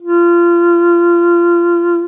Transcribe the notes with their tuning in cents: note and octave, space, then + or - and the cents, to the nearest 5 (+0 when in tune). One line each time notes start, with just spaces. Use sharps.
F4 -25